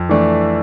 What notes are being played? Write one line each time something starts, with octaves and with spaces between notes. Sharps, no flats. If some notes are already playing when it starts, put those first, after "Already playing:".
Already playing: F2
E3 A3 D4